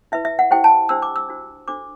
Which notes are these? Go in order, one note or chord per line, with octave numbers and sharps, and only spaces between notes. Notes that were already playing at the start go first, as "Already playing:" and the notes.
E4 B4 E5
E5
F#5
E4 G4 C5 G5
A5
D4 G4 C5 E6
D6
E6
D4 F#4 C5
D4 F#4 A4 C5 D6